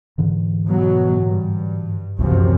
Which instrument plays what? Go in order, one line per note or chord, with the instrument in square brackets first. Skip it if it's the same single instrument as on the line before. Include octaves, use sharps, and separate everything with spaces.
[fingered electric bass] G#2 D3 E3
[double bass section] B2 F#3
G2
[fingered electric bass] C#2 A2 E3 [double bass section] F#2 C3 F3